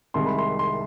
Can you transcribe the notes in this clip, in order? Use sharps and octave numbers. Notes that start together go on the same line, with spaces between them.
C2 C3 D#3 G#3 C6
B5
C6
C6